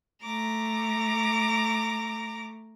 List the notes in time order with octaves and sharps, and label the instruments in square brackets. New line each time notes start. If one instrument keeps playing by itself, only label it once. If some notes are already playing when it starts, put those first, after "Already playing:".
[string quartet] A3 A#5 D6